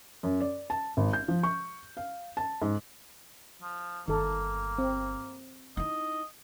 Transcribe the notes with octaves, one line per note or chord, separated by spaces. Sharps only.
F#2
D5
A5
G#1
G6
F3
C#6
F5
A5
G#2
F3
G1 D#3 A#3 A4
C4
D#4 E4 D#5